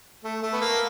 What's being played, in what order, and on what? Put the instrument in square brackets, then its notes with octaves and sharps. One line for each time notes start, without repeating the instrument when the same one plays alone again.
[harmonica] A3
A3
B3
A#3